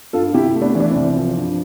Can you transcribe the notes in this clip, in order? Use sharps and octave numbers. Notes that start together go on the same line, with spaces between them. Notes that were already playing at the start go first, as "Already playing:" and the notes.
G2 F4 A4
C3 E4 G4
A3
B3 D4
E3
D4
C4
C2
F3
G2